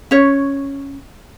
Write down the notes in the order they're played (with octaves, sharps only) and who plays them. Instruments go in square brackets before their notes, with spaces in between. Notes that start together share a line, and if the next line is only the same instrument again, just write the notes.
[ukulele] C#4 C#5